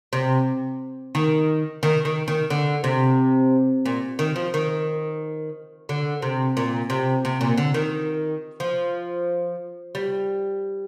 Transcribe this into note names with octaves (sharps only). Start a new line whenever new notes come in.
C3
D#3
D#3
D#3
D#3
D3
C3
A#2
D#3
F3
D#3
D3
C3
A#2
C3
C3
A#2
D3
D#3
F3
G3